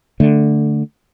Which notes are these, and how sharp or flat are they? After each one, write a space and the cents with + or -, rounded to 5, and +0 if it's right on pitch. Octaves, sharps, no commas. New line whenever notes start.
D3 +0 A3 +0